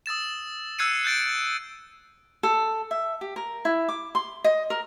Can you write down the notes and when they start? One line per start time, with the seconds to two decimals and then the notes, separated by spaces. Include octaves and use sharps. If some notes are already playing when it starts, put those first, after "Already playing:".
0.06 D#6 E6 A6 E7
0.79 E6 F#6 G#6 C7 C#7 D#7
1.04 F#6 G6 A6 D7
2.43 A4
2.91 E5
3.21 G4
3.36 A#4
3.65 E4
3.89 D6
4.15 C6
4.44 D#5
4.70 A#4